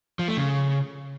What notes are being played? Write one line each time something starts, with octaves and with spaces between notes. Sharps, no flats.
F3
A3
C#3